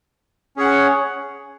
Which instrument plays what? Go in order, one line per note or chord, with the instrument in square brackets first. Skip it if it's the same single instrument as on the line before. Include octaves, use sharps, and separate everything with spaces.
[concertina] C#4 G#4 C#5 F#5